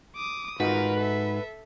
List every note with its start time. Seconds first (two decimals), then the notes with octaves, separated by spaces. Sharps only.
0.16 D6 D#6
0.60 G#2 D#4 F4 F#4 A#4 B4
0.98 A4 E5